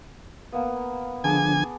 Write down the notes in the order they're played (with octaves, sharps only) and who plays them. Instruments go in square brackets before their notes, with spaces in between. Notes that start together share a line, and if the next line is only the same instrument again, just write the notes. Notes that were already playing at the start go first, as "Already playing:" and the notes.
[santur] A#3 B3
[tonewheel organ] D3 F3 D4 [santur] G#4 A5 D6 [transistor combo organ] G#5